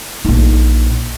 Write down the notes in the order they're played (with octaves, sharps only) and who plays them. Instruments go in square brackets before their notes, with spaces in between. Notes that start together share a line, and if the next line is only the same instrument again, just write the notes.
[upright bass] A#1 D#4